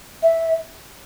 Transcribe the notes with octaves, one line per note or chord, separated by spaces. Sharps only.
E5